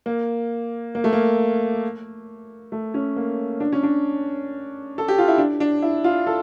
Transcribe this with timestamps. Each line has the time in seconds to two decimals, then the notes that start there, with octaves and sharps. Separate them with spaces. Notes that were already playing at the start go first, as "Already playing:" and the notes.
0.06 A#3
0.95 A#3
1.04 A3
1.13 A#3
2.72 A3
2.94 C#4
3.16 A#3
3.60 D4
3.73 C#4
3.83 D4
4.98 A4
5.08 G4
5.18 F4
5.28 E4
5.38 D4
5.60 D4
5.82 E4
6.04 F4
6.27 A4